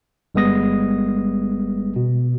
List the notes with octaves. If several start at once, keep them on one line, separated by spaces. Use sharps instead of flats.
G1 G3 G#3 B3 D#6 A#6
B2